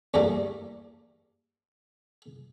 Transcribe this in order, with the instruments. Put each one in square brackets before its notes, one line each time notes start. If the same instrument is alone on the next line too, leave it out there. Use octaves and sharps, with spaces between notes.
[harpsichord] E2 G2 E3 G3 A3 A#3